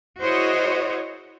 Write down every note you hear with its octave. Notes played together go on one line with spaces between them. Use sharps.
E4 F#4 G#4 C5 C#5 D#5